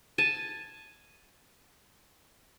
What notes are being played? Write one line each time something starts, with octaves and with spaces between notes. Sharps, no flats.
G#5 A5